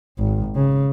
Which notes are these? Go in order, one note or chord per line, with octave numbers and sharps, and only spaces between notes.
G#1
C#3